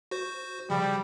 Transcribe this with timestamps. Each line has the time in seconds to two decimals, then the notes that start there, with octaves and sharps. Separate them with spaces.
0.11 F#4 C5
0.70 C#3 F3 G3